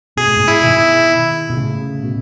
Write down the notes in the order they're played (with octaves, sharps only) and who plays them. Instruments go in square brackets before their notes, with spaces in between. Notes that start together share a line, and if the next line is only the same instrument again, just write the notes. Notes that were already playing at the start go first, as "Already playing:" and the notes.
[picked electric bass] B2 [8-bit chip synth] G#4
[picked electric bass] A2
G#2 B2
[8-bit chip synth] E4
[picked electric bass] B2 D#3
[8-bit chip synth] E4
[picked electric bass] B2
A2 C#3
B2